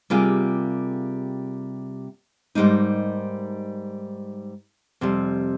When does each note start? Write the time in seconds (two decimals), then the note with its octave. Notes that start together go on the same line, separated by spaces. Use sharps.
0.10 C3 G3 A#3 F4 G#4
2.55 G#2 G3 A#3 D#4
5.01 F2 C3 G3